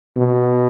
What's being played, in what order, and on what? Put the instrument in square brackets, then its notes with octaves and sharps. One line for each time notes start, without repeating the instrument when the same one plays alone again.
[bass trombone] B2